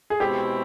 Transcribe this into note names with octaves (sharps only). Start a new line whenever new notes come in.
G#4
B2 G#3 C4 E4 G4